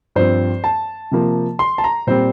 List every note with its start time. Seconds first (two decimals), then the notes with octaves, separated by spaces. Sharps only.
0.15 G2 F3 C4 C5
0.64 A5
1.11 C3 F3 A#3
1.59 C6
1.78 A5
1.84 A#5
2.07 A#2 G3 C4 C5